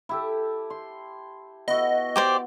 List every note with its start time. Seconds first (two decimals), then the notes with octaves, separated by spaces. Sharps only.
0.09 E4 G4 A4
0.70 C6
1.68 B3 E4 F#4 D#5
2.16 G4 C5 D5